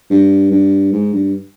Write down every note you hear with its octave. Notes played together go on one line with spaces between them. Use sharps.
G2
G2
G#2
G2